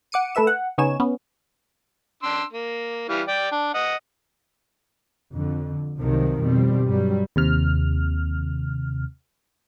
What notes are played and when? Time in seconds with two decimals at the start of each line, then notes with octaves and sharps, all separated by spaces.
0.12 F#5 D6 C#7 D#7
0.35 A3 A4 B4 E5 E7
0.47 F#5
0.78 C#3 B3 D#4 C#5 G#5 E7
1.00 B3 C#4
2.23 D4 C6 E6
2.52 A#3
3.09 E3 G3 F5
3.27 D5 G5
3.51 D4
3.74 D#5 F#5
5.33 F2 D3
5.98 C2 C3 D#3 F3 F#3
6.40 F2 B2 G3 C4
6.87 G2 F#3 G3
7.36 D#2 C3 F6